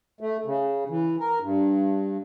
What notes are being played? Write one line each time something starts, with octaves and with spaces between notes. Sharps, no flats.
A3
C#3
E3
A#4
G2